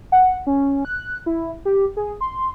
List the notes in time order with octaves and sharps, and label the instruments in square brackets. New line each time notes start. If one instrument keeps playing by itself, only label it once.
[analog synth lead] F#5
C#4
F#6
E4
G4
G#4
C6